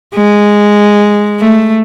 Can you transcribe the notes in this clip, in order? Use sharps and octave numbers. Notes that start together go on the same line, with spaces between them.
G#3
A3